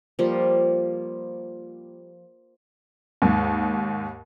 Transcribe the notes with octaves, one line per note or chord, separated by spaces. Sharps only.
F3 G3 A#3
D#2 G#2